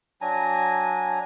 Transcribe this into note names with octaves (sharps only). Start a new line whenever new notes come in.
F#3 D4 G#5 A#5